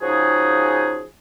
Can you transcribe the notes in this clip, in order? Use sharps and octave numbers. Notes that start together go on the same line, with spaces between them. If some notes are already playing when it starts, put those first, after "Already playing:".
C#3 F3 D#4 F#4 G#4